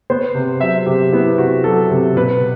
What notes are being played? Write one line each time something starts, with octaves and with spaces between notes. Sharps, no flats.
B3 C5
C3
F#3 E5
C3 G4
B3 E4
C3 F#4
F#3 A4
C3
B2 B4